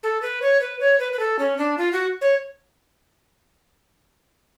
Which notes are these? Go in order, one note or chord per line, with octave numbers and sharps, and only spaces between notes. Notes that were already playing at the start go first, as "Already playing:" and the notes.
A4
B4
C#5
B4
C#5
B4
B4
A4
C#4
D4
F4
F#4
C#5